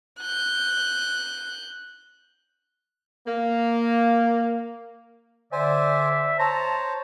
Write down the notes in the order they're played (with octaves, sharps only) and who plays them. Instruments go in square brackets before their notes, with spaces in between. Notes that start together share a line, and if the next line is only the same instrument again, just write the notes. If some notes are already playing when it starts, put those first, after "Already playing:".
[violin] F#6 G6
[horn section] A#3
[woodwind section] D3 D5 [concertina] C5 G#5 [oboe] E5
[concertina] C5 C#5 [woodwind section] A5 [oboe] A#5